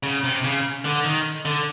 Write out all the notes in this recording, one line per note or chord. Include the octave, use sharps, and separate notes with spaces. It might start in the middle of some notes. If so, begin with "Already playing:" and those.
C#3
C3
C#3
D3
D#3
D3